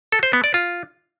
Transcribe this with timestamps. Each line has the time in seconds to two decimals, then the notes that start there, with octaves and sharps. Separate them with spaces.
0.12 A4
0.23 C5
0.33 B3
0.44 D5
0.54 F4